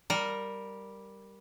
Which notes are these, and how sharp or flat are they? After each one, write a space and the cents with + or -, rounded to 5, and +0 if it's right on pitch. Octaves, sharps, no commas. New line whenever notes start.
G3 +0 A#4 +0